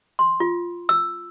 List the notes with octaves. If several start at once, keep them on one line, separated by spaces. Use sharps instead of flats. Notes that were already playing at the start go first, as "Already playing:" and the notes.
C6
F4
E6